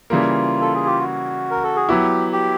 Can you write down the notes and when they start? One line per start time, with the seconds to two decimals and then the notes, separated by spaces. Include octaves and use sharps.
0.10 C#3 E3 G3 A#3 F4
0.61 A4
0.75 G#4
0.86 G4
0.99 F#4
1.51 A#4
1.64 A4
1.76 G#4
1.88 F#3 B3 E4 G4
2.33 G4